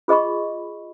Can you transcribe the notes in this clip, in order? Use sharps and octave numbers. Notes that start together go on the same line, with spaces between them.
F4 G#4 D#5 B5 C#6